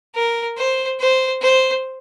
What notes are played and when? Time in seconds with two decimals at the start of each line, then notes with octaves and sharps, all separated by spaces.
0.15 A#4
0.57 C5
1.00 C5
1.42 C5